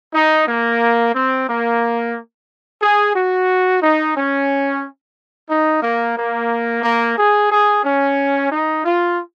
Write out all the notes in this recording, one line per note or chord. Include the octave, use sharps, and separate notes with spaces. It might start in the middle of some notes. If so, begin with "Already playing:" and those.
D#4
A#3
C4
A#3
G#4
F#4
D#4
C#4
D#4
A#3
A#3
A#3
G#4
G#4
C#4
D#4
F4